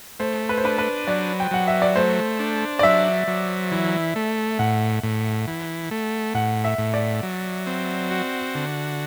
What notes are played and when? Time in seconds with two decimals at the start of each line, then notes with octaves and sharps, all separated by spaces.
0.19 A3 C5
0.49 B4
0.58 C5
0.64 D4 B4
0.78 B4
1.08 F#3 D5
1.40 G5
1.51 F#3 F#5
1.68 E5
1.82 D5
1.96 A3 C5
2.40 D4
2.79 D5
2.83 F#3 E5
3.28 F#3
3.71 E3
4.16 A3
4.59 A2 F#5
5.03 A2
5.47 E3
5.91 A3
6.34 A2 F#5
6.64 E5
6.78 A2
6.94 D5
7.23 F#3
7.67 C4
8.11 F#4
8.55 D3